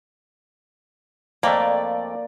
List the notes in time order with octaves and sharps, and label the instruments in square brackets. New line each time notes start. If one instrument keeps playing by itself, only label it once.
[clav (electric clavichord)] F2 A3 [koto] A#3 [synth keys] D5